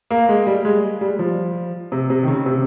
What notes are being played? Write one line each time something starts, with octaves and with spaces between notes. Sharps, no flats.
A#3
G#3
G3
G#3
G3
F3
C3
C3
D#3
C#3
C3